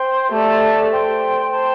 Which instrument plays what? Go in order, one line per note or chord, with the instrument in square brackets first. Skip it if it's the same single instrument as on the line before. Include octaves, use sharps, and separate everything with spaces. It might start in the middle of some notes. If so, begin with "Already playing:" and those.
Already playing: [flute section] C5 G5 C6
[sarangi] A3 [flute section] G4 D5 A5
[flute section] C5 G5 C6
C5 A5 C6